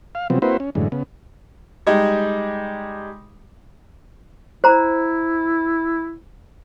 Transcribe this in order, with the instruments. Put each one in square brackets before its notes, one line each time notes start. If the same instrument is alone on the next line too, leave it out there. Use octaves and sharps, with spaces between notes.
[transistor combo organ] F5
C3 F3 F#3 B3 C4
A#3 C4 E4 F#4 B4 C5
C#4
F#2 A2 D3 E3 G#3
C#3 B3
[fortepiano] G3 G#3 D#4
[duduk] E4 [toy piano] C5 A#5